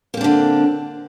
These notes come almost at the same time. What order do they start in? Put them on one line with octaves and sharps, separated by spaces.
A#3 C4 D4 D3